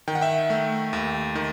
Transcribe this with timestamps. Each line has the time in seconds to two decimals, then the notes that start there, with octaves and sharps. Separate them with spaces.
0.08 D#3 G5
0.15 F#5
0.21 E5 G5
0.50 A3
0.93 D#2
1.35 D#3